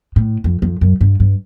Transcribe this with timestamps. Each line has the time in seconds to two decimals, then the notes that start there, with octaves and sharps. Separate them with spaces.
0.16 A2
0.44 F2
0.62 F2
0.81 F#2
1.01 G2
1.20 G2